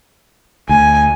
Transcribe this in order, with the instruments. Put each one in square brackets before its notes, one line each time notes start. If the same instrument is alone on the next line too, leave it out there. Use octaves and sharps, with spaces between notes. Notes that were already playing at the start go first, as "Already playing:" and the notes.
[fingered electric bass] D2 [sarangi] G#5